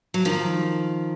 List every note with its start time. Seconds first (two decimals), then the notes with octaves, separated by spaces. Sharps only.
0.14 F#3
0.25 D#3 F3